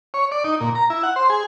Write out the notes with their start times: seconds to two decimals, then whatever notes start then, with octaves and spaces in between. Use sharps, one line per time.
0.14 C#5
0.32 D5
0.44 D#4
0.61 A#2
0.75 A#5
0.90 E4
1.03 F#5
1.16 C5
1.30 G#4